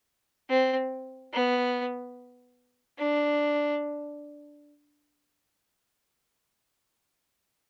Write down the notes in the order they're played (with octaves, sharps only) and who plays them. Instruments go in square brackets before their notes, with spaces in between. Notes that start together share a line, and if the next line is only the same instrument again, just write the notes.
[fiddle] C4
B3
D4